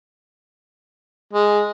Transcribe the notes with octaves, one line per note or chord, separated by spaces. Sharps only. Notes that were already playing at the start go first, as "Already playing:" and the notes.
G#3